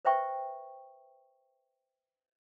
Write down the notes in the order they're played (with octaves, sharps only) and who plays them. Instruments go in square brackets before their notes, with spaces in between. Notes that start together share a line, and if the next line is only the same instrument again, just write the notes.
[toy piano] B4 C5 E5 G5 C#6